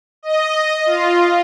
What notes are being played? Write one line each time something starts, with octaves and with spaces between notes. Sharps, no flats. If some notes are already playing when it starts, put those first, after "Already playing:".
D#5
F4